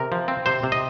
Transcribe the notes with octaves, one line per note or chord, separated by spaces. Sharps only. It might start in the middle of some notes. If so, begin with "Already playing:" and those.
Already playing: C3 A#4
F3
C4
C3 C5
C3
D#5